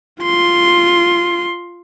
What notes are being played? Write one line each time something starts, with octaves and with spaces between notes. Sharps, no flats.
F4 C6